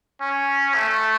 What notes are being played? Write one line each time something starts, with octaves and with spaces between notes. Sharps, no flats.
C#4
A3